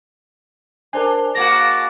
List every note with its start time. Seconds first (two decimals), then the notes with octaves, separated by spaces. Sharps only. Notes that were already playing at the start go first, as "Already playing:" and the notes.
0.93 D4 A#4 C5 G#5
1.35 G#3 A#3 F#4 A5 D6 A#6